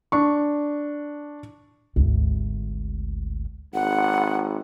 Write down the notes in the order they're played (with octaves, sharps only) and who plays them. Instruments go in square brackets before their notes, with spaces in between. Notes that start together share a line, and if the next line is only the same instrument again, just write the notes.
[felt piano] D4 C#6
[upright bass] G#1 D2
[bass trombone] G#1 [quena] F#5